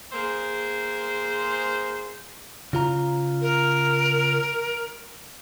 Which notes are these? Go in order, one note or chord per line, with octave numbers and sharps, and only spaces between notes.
A#3 G#4 C5
C#3 F4 A#5
A#4